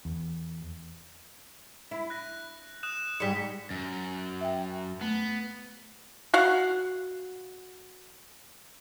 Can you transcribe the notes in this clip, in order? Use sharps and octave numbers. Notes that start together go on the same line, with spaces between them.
E2
E4
F#6 A#6
D#6 F#6 E7
G#2 G3 B6 C#7
F#2
E5 G5
A3 B3
F#4 F5 F#5